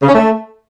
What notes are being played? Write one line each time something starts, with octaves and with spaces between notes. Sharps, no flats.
C#3
C#4
A3